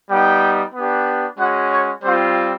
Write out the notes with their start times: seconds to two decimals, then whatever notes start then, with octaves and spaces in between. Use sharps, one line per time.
0.11 G3 B3 D#4 G5
0.75 B3 D4 G4
1.39 G#3 C#4 F#4 F#5
1.71 C#5
2.03 G3 C4 F4 C5